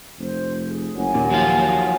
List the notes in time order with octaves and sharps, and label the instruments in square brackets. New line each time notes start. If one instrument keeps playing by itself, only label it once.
[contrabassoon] F1 [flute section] C5
[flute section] G#4
[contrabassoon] F#1 [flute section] C#5 F#5 G#5
[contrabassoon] D#2 [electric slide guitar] A#2
[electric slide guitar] F3 F#3 F4